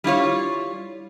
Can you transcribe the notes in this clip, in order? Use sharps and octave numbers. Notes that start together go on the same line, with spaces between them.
G3 E4 F4 C#5